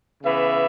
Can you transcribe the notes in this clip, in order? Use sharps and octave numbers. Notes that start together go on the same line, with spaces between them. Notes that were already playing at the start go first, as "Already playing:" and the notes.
C#3 E3 B3 E5